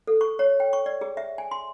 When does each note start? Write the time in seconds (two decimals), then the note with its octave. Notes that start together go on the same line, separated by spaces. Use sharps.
0.07 A4
0.21 C#6
0.39 C#5
0.60 G5
0.73 C#6
0.86 D5
1.01 G#4
1.17 E5
1.38 G#5
1.51 C6